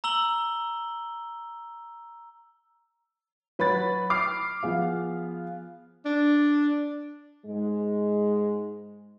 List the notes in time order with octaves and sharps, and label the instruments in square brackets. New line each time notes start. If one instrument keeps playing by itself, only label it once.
[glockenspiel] A#5 E6 F#7 G7
[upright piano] F#3 B4 C#5 B5 A6
D6 F6 C7
F3 B3 G#4 F5
[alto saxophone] D4
[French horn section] G#2 G#3